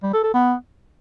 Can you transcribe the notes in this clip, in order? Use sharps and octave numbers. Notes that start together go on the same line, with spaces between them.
G3
A4
A4
B3